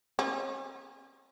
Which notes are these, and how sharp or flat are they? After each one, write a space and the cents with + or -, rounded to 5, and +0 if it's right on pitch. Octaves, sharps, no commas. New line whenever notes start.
C#4 -45